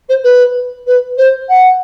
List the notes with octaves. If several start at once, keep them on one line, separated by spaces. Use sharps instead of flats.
C5
B4
B4
C5
F#5